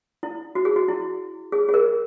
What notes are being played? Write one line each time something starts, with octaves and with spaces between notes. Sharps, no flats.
E4
F#4
G#4
F#4
E4
G#4
G#4
A#4